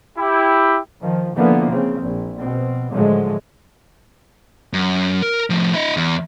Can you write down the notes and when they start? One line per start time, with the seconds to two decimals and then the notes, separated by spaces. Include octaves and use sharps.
0.18 E4 G4
1.01 D#3 F3
1.36 D3 E3 F3 A#3 B3
1.71 C#3 C4
2.01 A#1
2.39 B2 C4
2.91 A2 D3 F3 F#3 G#3
4.73 F#2
5.22 A#4
5.50 A2 F3
5.74 E4 D#5
5.97 E2